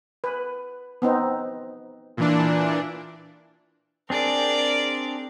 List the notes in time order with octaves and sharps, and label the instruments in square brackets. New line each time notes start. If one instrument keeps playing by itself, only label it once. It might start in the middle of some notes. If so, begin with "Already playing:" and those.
[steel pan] B4
B3 C4 D#4
[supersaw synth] A#2 E3 D4
[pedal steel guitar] C4 D4 G#4 [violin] A#4 D5